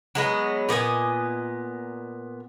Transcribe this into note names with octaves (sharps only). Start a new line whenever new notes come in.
F#3 G#3 B3
A#2 B3 D#5 G#5